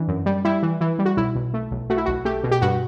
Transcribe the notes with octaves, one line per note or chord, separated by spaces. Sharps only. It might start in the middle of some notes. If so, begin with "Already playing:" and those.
Already playing: E3 D4
F#2
G3
G3 E4
E3
E3
G3
F#4
B1 E4
B1
A3
B1
A3 F#4
E4
B1 F#4
A3 G4
B2
G4
G2 F#4